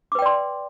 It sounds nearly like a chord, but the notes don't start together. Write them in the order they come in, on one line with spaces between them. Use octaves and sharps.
D6 B4 G5 D5 C6